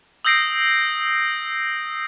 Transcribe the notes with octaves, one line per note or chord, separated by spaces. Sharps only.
D#6 E6 G6 A#6 C7 D7